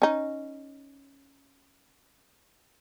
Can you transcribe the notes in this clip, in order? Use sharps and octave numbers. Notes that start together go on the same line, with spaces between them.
C#4 D#4